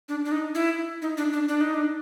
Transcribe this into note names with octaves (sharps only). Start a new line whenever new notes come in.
D4
D4
D#4
E4
D#4
D4
D4
D4
D#4
D4